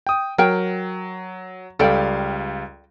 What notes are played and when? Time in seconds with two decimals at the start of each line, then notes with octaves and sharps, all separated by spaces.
0.07 G5 D#6
0.38 F#3 A#4 G5
1.79 C#2 G3 A4 D5 F5 G5